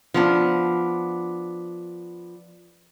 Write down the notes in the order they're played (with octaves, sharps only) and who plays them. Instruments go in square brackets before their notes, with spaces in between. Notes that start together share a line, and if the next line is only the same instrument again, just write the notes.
[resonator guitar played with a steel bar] F3 B3 D4